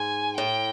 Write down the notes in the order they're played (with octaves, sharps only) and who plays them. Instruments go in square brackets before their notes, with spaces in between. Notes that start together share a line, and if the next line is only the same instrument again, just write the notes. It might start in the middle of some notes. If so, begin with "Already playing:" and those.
Already playing: [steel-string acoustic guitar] G#2 [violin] G#5
[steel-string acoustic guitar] A2 [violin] G5